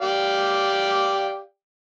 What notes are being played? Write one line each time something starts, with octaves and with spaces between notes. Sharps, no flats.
G4 D5 F5